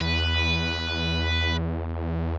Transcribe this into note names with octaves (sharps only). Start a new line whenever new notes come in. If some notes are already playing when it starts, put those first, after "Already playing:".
E2 B4